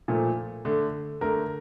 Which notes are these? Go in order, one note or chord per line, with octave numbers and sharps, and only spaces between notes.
A#2 F3 A3
D3 A3
D3 A3 A#4